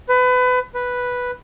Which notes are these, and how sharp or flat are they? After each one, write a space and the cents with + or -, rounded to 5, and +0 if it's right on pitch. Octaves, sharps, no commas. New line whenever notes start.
B4 +25
B4 -5